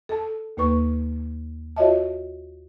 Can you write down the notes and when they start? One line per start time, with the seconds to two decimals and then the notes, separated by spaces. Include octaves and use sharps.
0.09 A4 A5
0.57 D#2 A#3 B4 C#6
1.77 F4 F#4 C#5 D#5 E5 A5